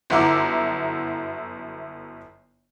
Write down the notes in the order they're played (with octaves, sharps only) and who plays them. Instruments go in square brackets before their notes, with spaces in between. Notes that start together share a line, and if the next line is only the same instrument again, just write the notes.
[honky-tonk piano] G1 F#2 E4 F#5 D6